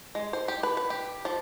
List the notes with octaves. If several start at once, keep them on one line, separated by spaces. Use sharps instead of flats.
G#3
C5
G4
B4
B4
G4
F3